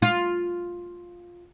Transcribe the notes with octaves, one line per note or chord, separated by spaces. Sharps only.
F4